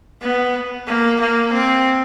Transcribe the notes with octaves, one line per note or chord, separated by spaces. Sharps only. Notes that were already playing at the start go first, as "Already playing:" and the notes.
B3
A#3
A#3
C4